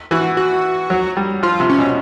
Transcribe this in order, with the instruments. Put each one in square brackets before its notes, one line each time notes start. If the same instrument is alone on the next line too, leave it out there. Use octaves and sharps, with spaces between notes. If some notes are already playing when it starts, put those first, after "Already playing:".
[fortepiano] E3 [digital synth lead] F#4
[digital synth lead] F#4
[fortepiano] F#3
G3
[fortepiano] F3 [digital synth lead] F4
[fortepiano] C3
[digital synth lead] C#4
[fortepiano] B2